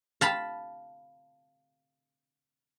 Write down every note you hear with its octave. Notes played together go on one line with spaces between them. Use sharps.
F5 A5 B5